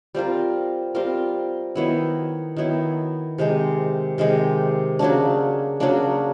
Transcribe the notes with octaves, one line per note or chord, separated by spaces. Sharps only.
G3 C4 F4 A#4
G3 C4 F4 A#4
D#3 F#3 B3 E4
D#3 F#3 B3 E4
C3 D#3 G#3
C3 D#3 G#3
C#3 F#3 A#3 D4
C#3 F#3 A#3 D4